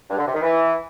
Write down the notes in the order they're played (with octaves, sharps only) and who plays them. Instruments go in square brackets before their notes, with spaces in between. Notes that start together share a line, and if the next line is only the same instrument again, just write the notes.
[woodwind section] G2
D3
C3
D#3
E3